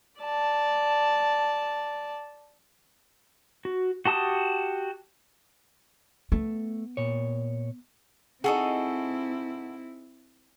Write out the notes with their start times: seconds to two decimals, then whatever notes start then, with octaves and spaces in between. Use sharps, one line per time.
0.20 D5 A5
3.65 F#4
4.05 F#4 G4 A5 D#6
6.32 A3 B3
6.97 A#2 C#5
8.44 C4 D#4 E4 F#4 G#4 A4 D#6